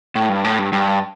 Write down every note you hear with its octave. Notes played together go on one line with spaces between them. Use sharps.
A2
G2
A2
G2
G2